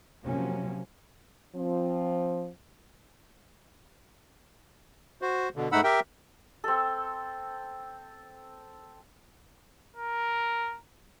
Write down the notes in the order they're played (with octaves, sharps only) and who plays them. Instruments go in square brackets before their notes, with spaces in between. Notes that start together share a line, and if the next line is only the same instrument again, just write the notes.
[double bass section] C3 F3 F#3 A#3 C#4
[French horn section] F3 C4
[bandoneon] F#4 C5
B2 D3
G#2 A3 D#4 F#5 B5 E6
G4 A#4 E5 G5
[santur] C4 A4
[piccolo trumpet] A#4